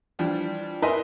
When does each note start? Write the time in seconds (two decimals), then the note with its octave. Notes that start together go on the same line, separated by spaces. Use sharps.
0.19 E3 F3 G3 D4
0.82 E4 A#4 B4 D#5 G#5 C6